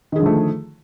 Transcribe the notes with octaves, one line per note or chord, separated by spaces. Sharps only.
D3 D#3 F3 A3 G#4